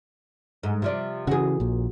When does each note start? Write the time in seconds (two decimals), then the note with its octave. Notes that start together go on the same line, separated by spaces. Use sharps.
0.63 G#2
0.82 C3 F3 D5
1.27 C#3 E3 F#4 G#4
1.60 A#1 A#2